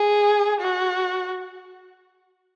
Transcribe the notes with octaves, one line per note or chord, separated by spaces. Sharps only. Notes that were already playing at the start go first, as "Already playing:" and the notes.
Already playing: G#4
F#4